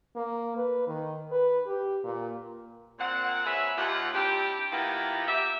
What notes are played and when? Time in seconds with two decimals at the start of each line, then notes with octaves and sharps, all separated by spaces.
0.16 A#3
0.56 B4
0.87 D#3
1.31 B4
1.66 G4
2.03 A#2
2.99 A#2 C4 F#5
3.46 G#4 B4 C#5 E5
3.77 D#2 F4 F#5
4.14 C4 D4 E4 G4
4.72 D#3 A#3 B3 E4 F4 G4
5.27 G4 E5